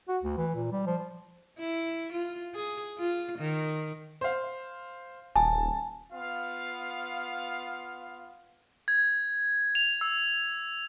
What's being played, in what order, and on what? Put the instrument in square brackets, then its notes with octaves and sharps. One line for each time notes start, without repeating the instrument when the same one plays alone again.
[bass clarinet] F#4
D2
E3
A#2
G3
F3
[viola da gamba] E4
F4
G#4
F4
D#3
[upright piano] C5 F5
[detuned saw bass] D#1 [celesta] G#5 [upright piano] A5
[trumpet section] B3 F4 F5
[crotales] G#6
F7
E6